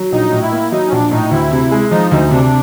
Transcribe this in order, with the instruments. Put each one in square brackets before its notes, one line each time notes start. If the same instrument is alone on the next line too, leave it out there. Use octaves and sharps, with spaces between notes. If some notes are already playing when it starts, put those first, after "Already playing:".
Already playing: [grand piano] F#3
[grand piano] A#1 [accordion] D#4
[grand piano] A2
[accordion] E4
[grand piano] A#3
[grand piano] F#3 [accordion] D#4
[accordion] C#4
[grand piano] A#1 [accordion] D4
[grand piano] A2 [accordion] D#4
[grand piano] D2 [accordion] E4
[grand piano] C3
G#3
[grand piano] F3 [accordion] D#4
[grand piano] D2 [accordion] D#4
[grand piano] C3 [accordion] D4